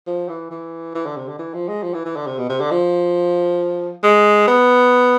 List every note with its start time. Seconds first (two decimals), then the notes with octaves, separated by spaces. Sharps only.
0.07 F3
0.29 E3
0.51 E3
0.95 E3
1.06 D3
1.17 C3
1.28 D3
1.39 E3
1.54 F3
1.69 G#3
1.83 F3
1.94 E3
2.05 E3
2.16 D3
2.27 C3
2.38 B2
2.49 C3
2.60 D3
2.71 F3
4.03 G#3
4.47 B3